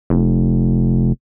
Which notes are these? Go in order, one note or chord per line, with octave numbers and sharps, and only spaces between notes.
F1